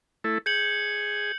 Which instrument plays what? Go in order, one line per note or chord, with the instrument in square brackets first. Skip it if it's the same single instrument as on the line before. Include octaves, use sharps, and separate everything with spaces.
[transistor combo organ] A3 E4 A4
[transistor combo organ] G#4 [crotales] G6 C#7 F#7